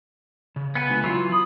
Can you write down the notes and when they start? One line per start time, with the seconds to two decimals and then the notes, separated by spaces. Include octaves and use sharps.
0.56 C#3
0.75 B3 F#5 G#5
0.90 D3 G#3 F4
1.04 E3 F#3 F4
1.32 B5 D#6